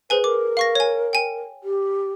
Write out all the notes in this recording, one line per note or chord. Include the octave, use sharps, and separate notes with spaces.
G#4 B4 C5 G#5
A#4 D6
F5 C#6 A#6
C#5 G#5
G5 G#5
G4